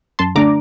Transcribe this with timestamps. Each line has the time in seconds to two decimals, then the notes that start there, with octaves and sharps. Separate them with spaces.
0.19 F#2 A5 C6
0.35 D3 A3 D4 A#5 D6